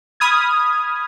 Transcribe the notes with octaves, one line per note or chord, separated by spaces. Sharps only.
B5 D#6 F6 G#6